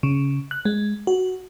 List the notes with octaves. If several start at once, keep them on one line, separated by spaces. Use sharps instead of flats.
C#3
F#6
G#3
F#4